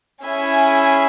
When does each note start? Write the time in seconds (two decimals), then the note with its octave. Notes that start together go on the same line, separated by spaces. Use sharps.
0.22 C#4 E4 G#4 E5 G#5